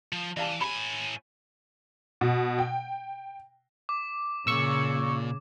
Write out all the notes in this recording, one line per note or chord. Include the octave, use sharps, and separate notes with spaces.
F3
E3 D5 F5 A5
A2 G#5 B5
B2
G5
D6
A#2 C#3 C#6 E6